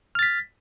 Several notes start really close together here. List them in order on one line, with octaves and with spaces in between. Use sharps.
F6 A6 B6